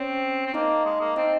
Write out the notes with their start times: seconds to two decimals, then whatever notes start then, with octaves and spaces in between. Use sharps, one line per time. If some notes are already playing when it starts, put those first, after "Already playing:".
Already playing: C4 C#4 C#5
0.46 C4
0.54 A#3 D#4 D#5
0.85 G#3
1.00 A#3
1.16 C4 D#4 D#5